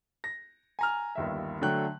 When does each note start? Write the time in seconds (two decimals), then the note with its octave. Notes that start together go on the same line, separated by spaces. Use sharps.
0.24 A#6
0.79 G#5 A#5 F6
1.15 G1 D#2 E5
1.61 D3 F#3 A3 G5 F#6